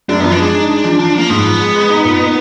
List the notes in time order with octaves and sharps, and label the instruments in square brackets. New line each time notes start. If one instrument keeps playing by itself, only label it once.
[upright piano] F#2 [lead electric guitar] D4
[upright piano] F3 [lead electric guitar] B3
[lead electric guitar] D4
[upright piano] G#3
D#4
G#3
F3
F3
[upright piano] F3 [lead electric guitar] A#3
[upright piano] G#2 [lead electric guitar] B3
[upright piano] F3
G#3
G#3
D#4
A#2
D#4